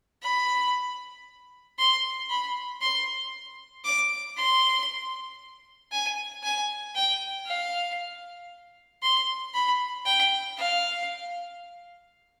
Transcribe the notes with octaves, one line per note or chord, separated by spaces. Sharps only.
B5
C6
B5
C6
D6
C6
G#5
G#5
G5
F5
C6
B5
G5
F5